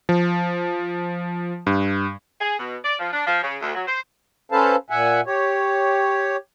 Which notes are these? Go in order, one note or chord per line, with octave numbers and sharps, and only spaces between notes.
F3
G2
G#4
B2
D5
F3
D4
F3
C#3
D2
F#3
C5
C#4 A4 B4 C5 F5 A5
A#2 E5 F#5 G#5
G4 C#5